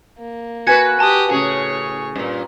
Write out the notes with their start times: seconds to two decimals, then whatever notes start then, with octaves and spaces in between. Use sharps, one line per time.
0.19 A#3
0.67 F#4 B4 G#5 G#6 C#7
0.99 G4 G#5 A5 D#6
1.31 A2 C#3 C#4 G#4 C#5
2.16 G2 A#2